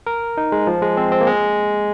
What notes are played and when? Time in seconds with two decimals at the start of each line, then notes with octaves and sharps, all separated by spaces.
0.07 A#4
0.37 D#4
0.52 G#3
0.67 F3
0.82 G#3
0.97 C4
1.12 C4
1.21 A#3
1.27 G#3